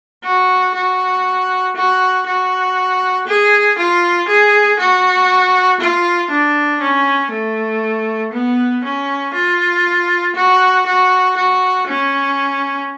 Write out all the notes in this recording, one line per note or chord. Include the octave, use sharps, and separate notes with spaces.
F#4
F#4
F#4
F#4
G#4
F4
G#4
F#4
F4
D4
C#4
A3
B3
C#4
F4
F#4
F#4
F#4
C#4